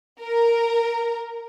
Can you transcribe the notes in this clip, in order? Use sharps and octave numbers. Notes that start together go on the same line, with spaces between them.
A#4